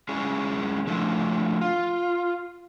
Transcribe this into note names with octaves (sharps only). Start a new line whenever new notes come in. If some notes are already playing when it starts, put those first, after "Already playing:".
G#3 C#4 E4 G#4
F3 A3 D4 E4
F4